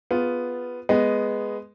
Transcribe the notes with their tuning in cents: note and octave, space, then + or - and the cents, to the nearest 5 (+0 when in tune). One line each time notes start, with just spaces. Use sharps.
B3 +0 F4 +0 G#4 +0
G#3 +0 B3 +0 D#5 +0